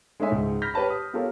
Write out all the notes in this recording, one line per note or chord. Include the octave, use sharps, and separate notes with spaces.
G#3 A3 D#4 C#5 E5 G#5
C#2 G#2
B5 F6 G6 A#6 B6
G4 B4 C#5 A5 B5
D#6
B3 F4 G4 A4 A#4 C#5